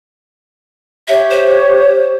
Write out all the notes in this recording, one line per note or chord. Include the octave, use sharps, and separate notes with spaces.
G4 C#5 E5
C5